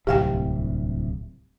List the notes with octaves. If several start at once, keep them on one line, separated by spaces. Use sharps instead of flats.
D1 C2 C3 G4 F5 G5